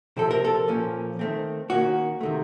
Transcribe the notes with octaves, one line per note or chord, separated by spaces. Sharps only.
C3 F3 A3 C4 A4
A#4
A4
A#2 F3 A#3 C#4
D#3 A3 C4
D#3 A#3 C#4 F#4
C3 D#3 A3